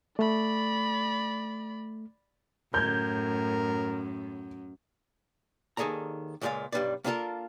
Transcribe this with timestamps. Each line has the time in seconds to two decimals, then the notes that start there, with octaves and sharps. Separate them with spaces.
0.19 A3 D5 B5
2.74 F#2 A2 A#4 G6 G#6
5.77 D#2 D#3 G#4 A4 D5 A#5
6.41 C#2 A#2 G#3 G4 D5 F5
6.72 B1 G2 G3 D4 B4 D5
7.04 A#3 B3 D4 F4 A4 A#4